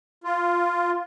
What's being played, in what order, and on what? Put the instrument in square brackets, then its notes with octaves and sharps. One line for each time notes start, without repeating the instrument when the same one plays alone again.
[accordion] F4